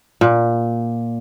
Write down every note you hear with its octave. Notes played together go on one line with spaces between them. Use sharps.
A#2